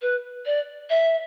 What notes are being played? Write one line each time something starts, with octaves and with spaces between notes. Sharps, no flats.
B4
D5
E5